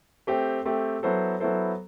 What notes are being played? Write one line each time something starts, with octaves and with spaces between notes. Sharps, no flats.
A3 C4 G4
A3 C4 G4
F#3 B3 E4 A4 C5
F#3 B3 E4 A4 C5